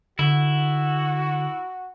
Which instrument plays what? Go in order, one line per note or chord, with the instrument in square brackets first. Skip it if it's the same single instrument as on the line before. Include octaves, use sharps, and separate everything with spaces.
[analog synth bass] D3 [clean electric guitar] E4 [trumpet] F#4